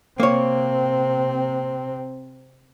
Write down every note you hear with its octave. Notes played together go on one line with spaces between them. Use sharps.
C3 A#3 C4 C#5